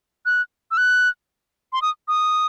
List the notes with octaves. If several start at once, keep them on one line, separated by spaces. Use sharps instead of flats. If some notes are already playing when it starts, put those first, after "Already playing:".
F#6
E6
F#6
C6
D#6
D#6